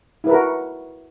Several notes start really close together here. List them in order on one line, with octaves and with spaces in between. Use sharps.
E4 B4 A#4 F#4